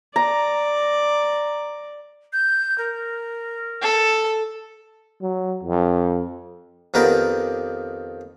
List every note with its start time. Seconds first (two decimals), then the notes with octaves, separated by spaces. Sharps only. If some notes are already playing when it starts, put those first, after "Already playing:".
0.16 D5 A#5
2.33 G6
2.78 A#4
3.82 A4
5.21 F#3
5.63 F2
6.94 F2 D#3 B3 G4 A#4 D5